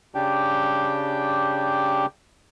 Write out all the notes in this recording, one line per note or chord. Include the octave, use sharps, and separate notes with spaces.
C#3 D4 G4 G5